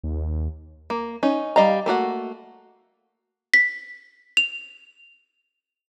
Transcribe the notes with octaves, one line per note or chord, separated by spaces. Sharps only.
D#2
A#3
C#4 D#4
G3 D#5 F5 A#5
A3 A#3 F#4 F#5
B6
F7